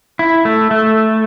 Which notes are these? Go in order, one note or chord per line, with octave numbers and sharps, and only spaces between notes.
E4
A3
A3